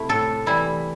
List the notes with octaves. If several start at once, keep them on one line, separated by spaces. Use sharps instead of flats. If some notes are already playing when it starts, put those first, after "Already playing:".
Already playing: C3 A3 E4
A2 A4
E3 G3 E4